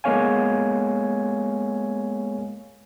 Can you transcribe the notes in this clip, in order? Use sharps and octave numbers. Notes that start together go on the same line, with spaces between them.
G#3 A#3 B3 C#5 F5 G#5